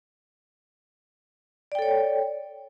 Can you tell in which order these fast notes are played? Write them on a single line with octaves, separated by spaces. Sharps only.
D5 G5 A4 C#5